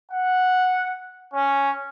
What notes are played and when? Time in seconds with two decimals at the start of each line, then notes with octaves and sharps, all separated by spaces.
0.11 F#5
1.33 C#4